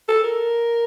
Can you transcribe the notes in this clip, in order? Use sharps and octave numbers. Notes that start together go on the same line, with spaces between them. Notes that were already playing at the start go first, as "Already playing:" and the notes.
A4
A#4